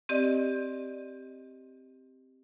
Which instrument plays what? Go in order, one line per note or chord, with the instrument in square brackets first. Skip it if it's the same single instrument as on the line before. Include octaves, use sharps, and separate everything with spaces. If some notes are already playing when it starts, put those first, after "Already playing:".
[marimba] C4 G4 D5 D#5